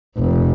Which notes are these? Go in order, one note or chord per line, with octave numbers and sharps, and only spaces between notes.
F1